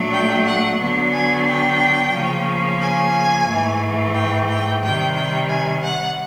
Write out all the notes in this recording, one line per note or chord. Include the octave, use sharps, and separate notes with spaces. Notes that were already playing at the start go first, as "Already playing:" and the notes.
Already playing: A#2 F#3 A3 D4
G5
F#5
D3 F#3 B3 D4
G#5
G5
C#3 F3 A#3 C#4
G#5
G#2 E3 A3
G5
G5
C3 D#3 G3 G5
G5
G#5
F#5